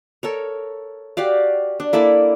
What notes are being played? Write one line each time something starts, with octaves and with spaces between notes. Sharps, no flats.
A4 A#4 C#5
F#4 G4 D5 F5
D4
A#3 E4 A4 D5